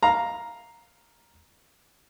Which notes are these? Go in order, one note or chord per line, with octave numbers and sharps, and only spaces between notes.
F5 A#5